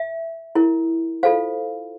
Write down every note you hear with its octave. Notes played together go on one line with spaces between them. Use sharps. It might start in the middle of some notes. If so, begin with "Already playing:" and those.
Already playing: E5
E4 A#4
F4 A4 C5 F5